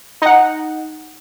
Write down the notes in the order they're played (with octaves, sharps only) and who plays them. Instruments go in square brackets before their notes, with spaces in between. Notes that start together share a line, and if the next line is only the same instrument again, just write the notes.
[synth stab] D#4 F#5